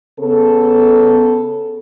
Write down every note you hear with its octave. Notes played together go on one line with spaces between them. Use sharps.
C#3 B3 A4